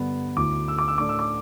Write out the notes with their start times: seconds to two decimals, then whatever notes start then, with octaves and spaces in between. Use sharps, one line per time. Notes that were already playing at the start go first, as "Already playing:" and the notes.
Already playing: G2 D3 B3 D4
0.36 D2 D3 A3 E4 D6
0.68 E6
0.78 D6
0.88 E6
0.98 A2 A3 D4 D6
1.09 E6
1.19 D6